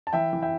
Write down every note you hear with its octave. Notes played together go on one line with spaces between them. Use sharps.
A5
E3 E5 G5
E3
E5 G5